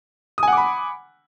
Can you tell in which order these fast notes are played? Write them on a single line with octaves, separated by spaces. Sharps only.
D#6 G#5 F#5 D6 B5